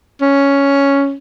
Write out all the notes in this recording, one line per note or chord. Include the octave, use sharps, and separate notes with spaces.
C#4